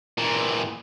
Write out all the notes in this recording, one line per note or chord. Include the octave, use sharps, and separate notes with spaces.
A#2 E3